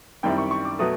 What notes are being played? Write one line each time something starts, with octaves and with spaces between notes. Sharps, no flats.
F#2 D#3 G3 C4 E4 G5
C#6
C#6
D6
B2 F#3 A3 D#6